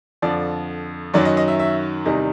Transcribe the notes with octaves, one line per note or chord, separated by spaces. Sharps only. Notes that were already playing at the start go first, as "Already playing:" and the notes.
F2 D3 F3 D5
F#2 D#3 F#3 D5
D#5
D#5
E5
E5
E2 C3 D#3 G3 D#5